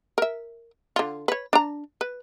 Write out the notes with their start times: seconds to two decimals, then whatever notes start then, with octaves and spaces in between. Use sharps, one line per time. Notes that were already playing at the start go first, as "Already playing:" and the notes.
0.18 A#4 E5
0.96 D3 F4
1.28 B4 C#5
1.53 D4 A#5
2.01 B4